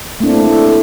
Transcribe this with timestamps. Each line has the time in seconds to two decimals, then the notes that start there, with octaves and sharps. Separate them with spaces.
0.20 A3 A#3 C4 D4 E4
0.45 E4 A4